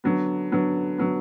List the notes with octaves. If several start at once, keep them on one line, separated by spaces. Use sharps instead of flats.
D3 F#3 B3
D3 F#3 B3
D3 F#3 B3